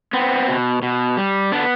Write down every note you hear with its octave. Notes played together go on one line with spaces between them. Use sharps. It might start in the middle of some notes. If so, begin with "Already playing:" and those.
B3 C4
B2
B2
G3
D3 B3 D4